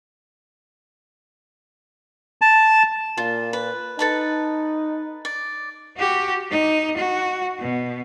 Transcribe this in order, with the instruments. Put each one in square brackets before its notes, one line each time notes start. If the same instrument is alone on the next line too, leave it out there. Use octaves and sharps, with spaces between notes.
[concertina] A5
[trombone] A#2 [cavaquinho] F4
[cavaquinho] B4
[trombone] D#4 [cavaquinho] A4 B4 A5
[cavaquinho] D5
[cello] F#4 G4
D#4
F#4
B2